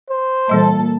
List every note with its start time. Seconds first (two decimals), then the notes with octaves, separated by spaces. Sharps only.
0.10 C5
0.49 A#2 E3 G3 A4 D#5